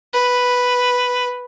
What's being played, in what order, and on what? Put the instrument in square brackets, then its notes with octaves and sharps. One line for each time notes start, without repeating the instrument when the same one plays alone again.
[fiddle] B4